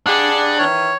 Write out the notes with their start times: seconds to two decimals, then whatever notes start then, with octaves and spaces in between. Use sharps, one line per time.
0.06 G2 D4 G#4 F#5
0.59 D#3 E3 C#5